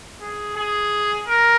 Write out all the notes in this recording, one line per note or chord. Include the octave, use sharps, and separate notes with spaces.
G#4
G#4
A#4